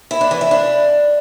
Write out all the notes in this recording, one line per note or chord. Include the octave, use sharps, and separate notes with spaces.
E4
D4
E3
E4
D4